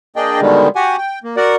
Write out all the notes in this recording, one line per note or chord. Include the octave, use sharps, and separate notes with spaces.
A#3 D4 G#4 D5 D#5 G5
B2 D3 D#3 G3 G#3
F#4 G4 F#5 G#5
G5
A#3
F#4 A#4 D5 F#5